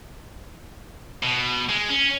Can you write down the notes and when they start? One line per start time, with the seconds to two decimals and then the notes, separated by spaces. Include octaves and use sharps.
1.23 B2
1.69 G#3
1.89 C#4